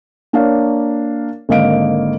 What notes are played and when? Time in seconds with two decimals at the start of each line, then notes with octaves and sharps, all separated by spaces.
0.33 A#3 D4 A#4 C#5 F5
1.49 G#1 D3 A#3 D#5 F5 D7